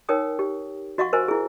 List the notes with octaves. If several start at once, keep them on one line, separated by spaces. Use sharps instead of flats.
D#4 A#4 C#5 G5 D#6
G4
F#4 D#5 F5 F#5 C#6
A#4 C5 D#5 G#5
E4 G#4